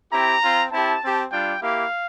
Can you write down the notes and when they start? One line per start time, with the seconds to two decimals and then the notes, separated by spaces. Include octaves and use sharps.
0.13 C4 E4 G4 A#5
0.43 C4 F4
0.72 C4 E4 G4 A5
1.03 C4 G4
1.32 G3 D4 F4 G5
1.62 A#3 E4 G4 F5